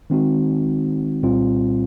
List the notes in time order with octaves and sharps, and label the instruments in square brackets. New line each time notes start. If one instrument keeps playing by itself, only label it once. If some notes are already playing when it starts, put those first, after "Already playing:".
[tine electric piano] D#3 G#3 C4 D#4 F#4
C2 A#2 G3 C4 F4